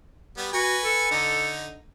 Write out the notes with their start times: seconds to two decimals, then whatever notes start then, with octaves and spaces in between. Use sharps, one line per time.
0.37 G3 B3
0.53 F#4 B4 G#5
0.83 A4
1.11 D3 D#4